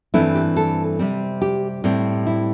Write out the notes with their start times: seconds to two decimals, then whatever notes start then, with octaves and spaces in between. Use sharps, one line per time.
0.14 G2 E3 A3 C4 E4
0.35 G4
0.56 A4
0.99 C3 G3 C4
1.42 G4
1.84 A2 G3 C4
2.27 E4